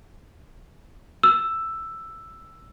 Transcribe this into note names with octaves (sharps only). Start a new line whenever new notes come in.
E6